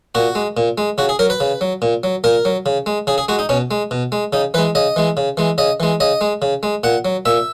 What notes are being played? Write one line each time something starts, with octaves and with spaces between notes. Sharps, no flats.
A#2 F#4
G#3
A#2
G#3
C#3 F#4
G#4
F#3 A#4
B4
C#3
F#3
A#2
F#3
A#2 A#4
F#3
C#3
G#3
C#3 G#4
G#4
G#3 F#4
D#4
B2 C#4
G#3
B2
G#3
C#3 D#4
E3 G#3 B4
C#3 D#5
E3 G#3
C#3
E3 G#3
C#3 D#5
E3 G#3
C#3 D#5
G#3
C#3
G#3
A#2 F#5
F#3
A#2 E5